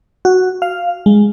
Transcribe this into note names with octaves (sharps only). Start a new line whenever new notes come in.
F#4
F5
G#3